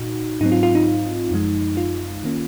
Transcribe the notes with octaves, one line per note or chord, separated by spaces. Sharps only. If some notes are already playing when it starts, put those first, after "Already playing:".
Already playing: A#2 D#4 F#4
G#2 F#3 C4 D#4
F4
F4
D#4
F#2 F3 G#3
F4
D#3 A#3 C#4